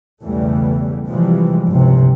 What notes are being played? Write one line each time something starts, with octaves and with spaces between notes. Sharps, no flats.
B1 E2 C#3 E3 G3 A3
C3 E3 F3 G3 G#3
G1 C#2 C3 E3